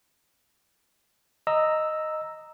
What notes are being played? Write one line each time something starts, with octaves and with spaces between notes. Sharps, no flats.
D#5 A#5 E6